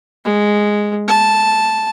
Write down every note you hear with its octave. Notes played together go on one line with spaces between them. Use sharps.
G#3
A5